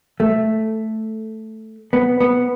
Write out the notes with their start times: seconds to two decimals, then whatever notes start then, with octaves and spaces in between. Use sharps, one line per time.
0.20 A3
1.93 B3
2.20 B3